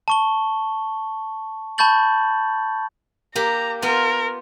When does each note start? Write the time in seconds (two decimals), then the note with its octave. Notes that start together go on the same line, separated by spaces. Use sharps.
0.08 A5 C#6 G7
1.78 A5 B5 C#6 G6 A6 F#7
3.35 A#3 G4 A#5
3.82 B3 F4 A#4